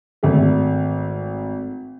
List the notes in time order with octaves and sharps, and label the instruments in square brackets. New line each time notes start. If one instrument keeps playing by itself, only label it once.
[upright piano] G#1 A3